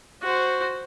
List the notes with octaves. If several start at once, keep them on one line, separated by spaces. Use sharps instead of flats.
F#4 C5